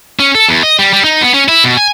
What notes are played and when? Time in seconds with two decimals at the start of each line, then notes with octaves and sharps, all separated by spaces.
0.19 C#4
0.35 A4
0.49 E2
0.63 D#5
0.79 G3
0.93 G3
1.04 D#4
1.21 B3
1.34 C#4
1.48 E4
1.64 B2
1.77 G#5